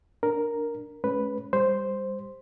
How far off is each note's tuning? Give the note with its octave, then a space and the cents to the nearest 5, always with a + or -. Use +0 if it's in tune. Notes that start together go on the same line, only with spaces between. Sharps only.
D4 +0 A#4 +0
G#3 +45 C#4 +0 B4 +0
G3 +20 C5 +0